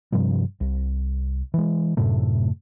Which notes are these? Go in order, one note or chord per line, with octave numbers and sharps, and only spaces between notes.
G2 C3 F3 G3
C2
E3 G#3
F#2 A2 C3 A3